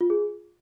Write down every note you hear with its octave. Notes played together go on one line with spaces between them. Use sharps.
F4
G#4